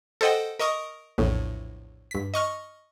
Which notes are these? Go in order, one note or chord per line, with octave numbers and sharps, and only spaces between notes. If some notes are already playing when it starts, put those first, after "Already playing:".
A4 C5 D#5 F#5 G5
A#4 D#5 C#6 D#6
A#1 E2 A2
G2 B6
D#5 C#6 F6